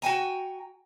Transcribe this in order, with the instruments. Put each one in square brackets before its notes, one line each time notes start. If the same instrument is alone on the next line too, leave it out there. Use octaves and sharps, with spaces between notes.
[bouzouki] F#4 G5 G#5 A#5